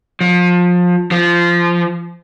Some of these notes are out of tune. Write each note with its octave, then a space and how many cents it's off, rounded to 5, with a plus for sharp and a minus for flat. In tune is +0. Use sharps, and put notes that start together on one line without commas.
F3 +25
F3 -15